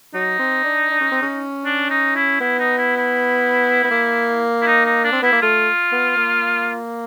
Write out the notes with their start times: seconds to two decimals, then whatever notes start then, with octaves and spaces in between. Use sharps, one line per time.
0.14 F#3 D#4
0.39 C4
0.64 D4
0.90 D4
1.01 C#4
1.12 C4
1.22 C#4
1.65 D4
1.90 D#4
2.15 E4
2.41 B3 E4
2.59 D#4
2.78 E4
2.97 E4
3.84 B3
3.91 A#3
4.62 E4
4.67 D#4
4.86 D#4
5.04 D4
5.12 C4
5.22 B3 E4
5.33 A#3
5.42 A3 F4
5.92 B3
6.17 A#3